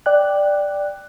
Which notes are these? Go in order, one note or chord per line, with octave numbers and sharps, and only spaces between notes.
D5 G5 F#6